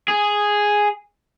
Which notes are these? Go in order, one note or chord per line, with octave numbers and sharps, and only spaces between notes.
G#4